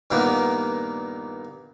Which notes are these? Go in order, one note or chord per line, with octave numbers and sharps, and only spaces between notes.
G2 A#2 D#3 A#3 B3